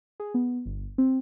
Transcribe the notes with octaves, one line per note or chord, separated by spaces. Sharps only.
G#4
B3
G1
C4